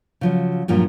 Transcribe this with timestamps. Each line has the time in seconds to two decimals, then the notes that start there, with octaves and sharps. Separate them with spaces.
0.21 C#3 F3 F#3
0.68 G2 A#2 F3 F#3